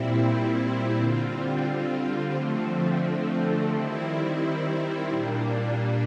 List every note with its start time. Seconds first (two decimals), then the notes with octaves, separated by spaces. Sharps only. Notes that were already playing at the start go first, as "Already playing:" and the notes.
Already playing: A#2 G3 C4 E4
0.96 D3 G3 C4 F4
2.34 D3 F3 A3 C4
3.72 D#3 G3 C4 E4
5.10 A#2 G3 A#3 D4